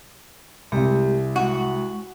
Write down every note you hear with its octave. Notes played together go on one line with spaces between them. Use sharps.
C2 G#3 G4
G#3 F#4 C#6